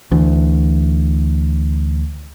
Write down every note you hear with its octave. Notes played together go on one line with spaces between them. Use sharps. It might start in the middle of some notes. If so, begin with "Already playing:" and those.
D2 E3